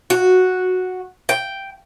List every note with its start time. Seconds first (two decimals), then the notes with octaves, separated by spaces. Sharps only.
0.10 F#4
1.29 G5